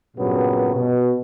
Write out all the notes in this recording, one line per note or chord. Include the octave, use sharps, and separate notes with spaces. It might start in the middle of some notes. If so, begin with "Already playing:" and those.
G2 A#2 C#3 F#3 B3
B2